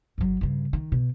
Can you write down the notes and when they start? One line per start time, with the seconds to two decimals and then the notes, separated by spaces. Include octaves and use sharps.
0.18 G1 F#3
0.41 G2 C#3
0.73 D#3
0.92 B2